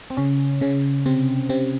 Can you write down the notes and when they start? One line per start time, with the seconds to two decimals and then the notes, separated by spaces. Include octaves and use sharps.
0.10 C4
0.17 C#3 C#4
0.61 C#3 C#4
1.06 C3 C4
1.49 C3 C4